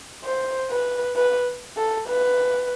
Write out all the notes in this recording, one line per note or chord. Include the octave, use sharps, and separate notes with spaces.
C5
B4
B4
A4
B4